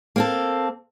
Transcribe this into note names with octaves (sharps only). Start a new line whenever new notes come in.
A#3 C4 A4